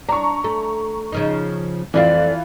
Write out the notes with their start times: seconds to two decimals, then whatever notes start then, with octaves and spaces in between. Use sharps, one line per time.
0.09 D4 A#5 C#6
0.44 A3
1.12 C#3 F3 D#4
1.94 F2 E3 A3 C4 F4 D5